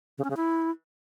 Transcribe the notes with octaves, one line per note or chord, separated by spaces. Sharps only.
C#3
C#4
C#3
E4